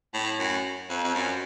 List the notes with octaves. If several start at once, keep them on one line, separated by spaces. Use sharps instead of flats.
A2
F#2
F2
F2
F#2